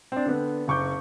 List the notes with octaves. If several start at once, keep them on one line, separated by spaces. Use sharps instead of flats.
C4 D4
D3 B3
F#1 C#6 D6 G6